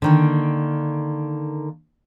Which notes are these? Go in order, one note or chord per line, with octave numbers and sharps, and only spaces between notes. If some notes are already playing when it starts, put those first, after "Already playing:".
D3 D#3 A#3